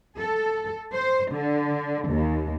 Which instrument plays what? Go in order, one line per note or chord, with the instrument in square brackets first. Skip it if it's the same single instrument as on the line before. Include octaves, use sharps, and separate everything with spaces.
[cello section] A4
C5
D3
D#2